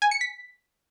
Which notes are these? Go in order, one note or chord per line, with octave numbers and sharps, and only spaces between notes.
G#5
C#7
B6